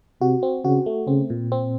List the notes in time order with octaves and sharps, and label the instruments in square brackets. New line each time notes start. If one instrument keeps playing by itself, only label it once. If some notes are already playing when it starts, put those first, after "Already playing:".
[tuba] C3 [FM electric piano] F#4
[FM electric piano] C4
[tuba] C#3 [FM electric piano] F#4
[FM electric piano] A3
[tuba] C#3 [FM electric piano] C4
[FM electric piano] A#2
C4